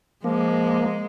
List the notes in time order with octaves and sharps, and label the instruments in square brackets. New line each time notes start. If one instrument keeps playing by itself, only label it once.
[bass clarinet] F3 [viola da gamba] G#3 [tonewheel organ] A#3